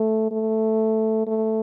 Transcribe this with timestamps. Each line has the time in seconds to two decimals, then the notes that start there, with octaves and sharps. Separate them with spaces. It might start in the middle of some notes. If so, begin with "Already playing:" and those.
Already playing: A3
0.31 A3
1.27 A3